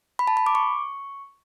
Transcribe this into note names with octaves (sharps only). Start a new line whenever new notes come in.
B5
A5
B5
D6
C#6